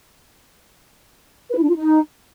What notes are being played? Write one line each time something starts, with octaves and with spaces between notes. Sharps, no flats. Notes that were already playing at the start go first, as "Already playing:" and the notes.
B4
E4
D4
F4
D#4